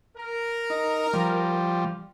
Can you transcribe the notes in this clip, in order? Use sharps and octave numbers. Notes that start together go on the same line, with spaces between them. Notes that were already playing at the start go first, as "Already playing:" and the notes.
A#4
D#4
F3 G3